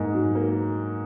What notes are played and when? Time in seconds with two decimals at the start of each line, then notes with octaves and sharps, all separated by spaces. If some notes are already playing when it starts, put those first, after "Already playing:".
Already playing: G#2 A#3 D#4
0.14 F#3
0.35 A#3